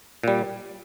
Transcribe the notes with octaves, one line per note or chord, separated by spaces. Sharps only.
A#2 G3